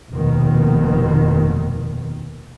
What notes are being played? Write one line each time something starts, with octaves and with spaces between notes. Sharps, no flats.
F1 D#2 B2 D#3